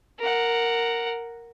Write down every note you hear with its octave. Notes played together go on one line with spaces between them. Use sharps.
A#4 F#5